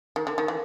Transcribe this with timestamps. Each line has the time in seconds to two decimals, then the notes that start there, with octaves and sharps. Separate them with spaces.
0.16 D#3
0.27 D3
0.38 D#3
0.48 E3